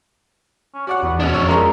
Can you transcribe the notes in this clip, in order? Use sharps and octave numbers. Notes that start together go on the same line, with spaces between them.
C#4
F#4 C#5 D5 F#5
E2 B3
A#1 B2 C#4 D4
F2 F#4 E6
G#1 G#3 A#4 C6